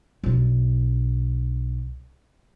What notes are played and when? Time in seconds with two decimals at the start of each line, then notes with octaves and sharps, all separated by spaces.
0.24 B1 D4